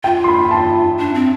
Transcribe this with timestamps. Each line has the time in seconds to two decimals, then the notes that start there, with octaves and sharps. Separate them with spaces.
0.04 F4 G5
0.24 C6
0.28 B5
0.51 A5
0.98 D4
1.14 C4